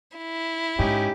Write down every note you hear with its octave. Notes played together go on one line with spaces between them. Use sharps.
E4
G#2 C#4 D#4 G4